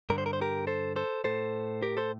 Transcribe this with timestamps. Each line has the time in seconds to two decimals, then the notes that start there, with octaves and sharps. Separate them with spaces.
0.10 G2 D3 A#4
0.18 C5
0.26 A#4
0.33 C5
0.41 G4 A#4
0.67 A4 C5
0.96 A4 C5
1.24 A2 A4 C5
1.82 G4 A#4
1.97 A4 C5